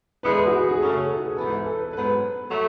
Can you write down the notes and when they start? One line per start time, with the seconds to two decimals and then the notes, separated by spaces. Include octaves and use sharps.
0.23 E2 D3 G#3 B3 E4 B4
0.46 F#4
0.51 G#4
0.69 G#4
0.80 F#2 C#3 F#3 A3 C#4 A4
0.98 A4
1.17 G#4
1.36 G#2 E3 B3 A4
1.50 B4
1.64 A4
1.78 B4
1.93 G#2 F#3 B3 B4
2.50 F#3 A3